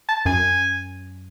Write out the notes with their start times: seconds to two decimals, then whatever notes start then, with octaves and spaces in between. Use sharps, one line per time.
0.08 A5
0.26 F#2 G#5